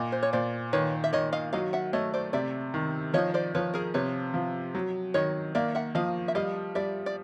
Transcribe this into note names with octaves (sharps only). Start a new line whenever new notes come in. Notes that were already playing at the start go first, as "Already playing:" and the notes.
Already playing: A#2 D#5
C5
C#5
A#2 C5 D5
D#3 B4 C#5
E5
D#3 C#5 D#5
D#5 F5
F#3 D#5 F5
E5 F#5
A3 C#5 D#5
C5 D5
C3 D5 E5
D#3
F3 C#5 D#5
C5 D5
F3 B4 C#5
G#4 A#4
C3 B4 C#5
F3
F#3
D#3 C#5 D#5
A#3 D5 E5
E5 F#5
F3 D#5 F5
E5
G3 D#5 F5
G3 D5 E5
D5